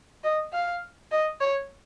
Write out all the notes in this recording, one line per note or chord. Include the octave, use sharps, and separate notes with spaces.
D#5
F5
D#5
C#5